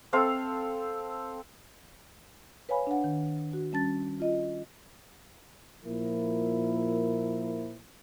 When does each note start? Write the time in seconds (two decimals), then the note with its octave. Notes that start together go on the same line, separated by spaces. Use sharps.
0.13 C4 A4 F5 C6
2.69 B4 C#5 F5 G#5 B5
2.87 D4 F#5
3.04 D#3
3.53 F#4
3.72 G3 C#4 A5 A6
4.20 F4 D#5
5.84 A#2 F3 E4 A#4